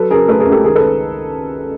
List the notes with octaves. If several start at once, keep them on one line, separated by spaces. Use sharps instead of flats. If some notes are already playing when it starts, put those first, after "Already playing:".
Already playing: F#3 A4 B4
C#3 G#4 A#4
A3 A4 B4
G#4 A#4
C#2
G4 A4
D#3 G#4 A#4
A4 B4